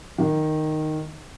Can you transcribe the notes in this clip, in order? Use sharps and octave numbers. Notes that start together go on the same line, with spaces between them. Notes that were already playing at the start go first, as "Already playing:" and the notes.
D#3